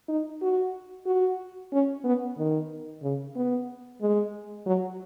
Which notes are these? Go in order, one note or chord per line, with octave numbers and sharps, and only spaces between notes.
D#4
F#4
F#4
C#4
B3
D#3
C#3
B3
G#3
F#3